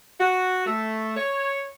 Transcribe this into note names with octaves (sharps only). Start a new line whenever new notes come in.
F#4
A3
C#5